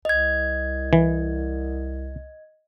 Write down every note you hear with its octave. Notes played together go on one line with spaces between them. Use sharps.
C2 D#5 G#6
E3